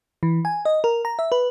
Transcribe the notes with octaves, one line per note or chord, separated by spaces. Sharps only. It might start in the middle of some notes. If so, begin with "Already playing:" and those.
E3
G#5
D#5
A#4
A#5
E5
B4